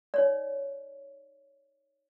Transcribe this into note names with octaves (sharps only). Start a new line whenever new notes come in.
D#4 C#5 D5